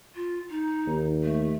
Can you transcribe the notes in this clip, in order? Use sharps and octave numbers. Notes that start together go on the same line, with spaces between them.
F4
D#4
D#2
A3